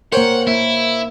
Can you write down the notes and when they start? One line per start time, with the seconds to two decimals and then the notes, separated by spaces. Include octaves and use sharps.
0.12 A#3 A#4 C5 C#5 F#5 G5
0.47 A#3 E4